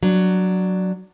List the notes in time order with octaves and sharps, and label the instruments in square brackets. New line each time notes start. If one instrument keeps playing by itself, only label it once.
[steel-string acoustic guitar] F#3 D4